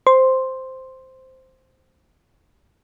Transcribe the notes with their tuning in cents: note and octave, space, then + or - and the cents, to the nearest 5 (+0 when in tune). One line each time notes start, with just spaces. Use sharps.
C5 -5 C6 +0